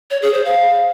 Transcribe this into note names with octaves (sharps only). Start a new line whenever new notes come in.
C#5
G#4
C5
F5